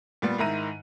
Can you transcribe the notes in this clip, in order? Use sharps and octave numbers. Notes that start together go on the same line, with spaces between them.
A#2 G3 B3
G#2 D#3 E4 A#5 D#7